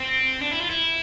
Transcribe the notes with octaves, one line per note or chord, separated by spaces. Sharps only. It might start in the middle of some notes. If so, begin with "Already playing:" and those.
Already playing: C4
D4
E4
F4
E4